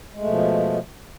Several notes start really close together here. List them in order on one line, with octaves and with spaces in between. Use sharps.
G#3 A3 B2 F3